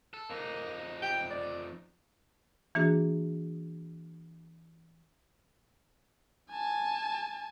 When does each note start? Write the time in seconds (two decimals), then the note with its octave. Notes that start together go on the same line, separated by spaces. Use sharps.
0.14 A4
0.30 F2 A#3 D#4
1.02 G5
1.30 D5
2.75 E3 A#3 D4 F#4 G#4
6.51 G#5 A5